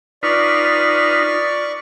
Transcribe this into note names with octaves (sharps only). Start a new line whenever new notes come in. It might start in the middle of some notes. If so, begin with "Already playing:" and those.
D#4 F4 B4 D5 C#6